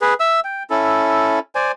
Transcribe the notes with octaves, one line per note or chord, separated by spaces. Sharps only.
G#4 B4
E5 E6
G5
C#4 E4 A4
C5 D5 G#5